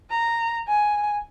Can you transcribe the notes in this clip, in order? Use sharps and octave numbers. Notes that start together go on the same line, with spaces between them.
A#5
G#5